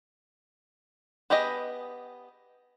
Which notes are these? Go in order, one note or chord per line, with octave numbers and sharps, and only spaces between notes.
B3 G4 G#4 D#5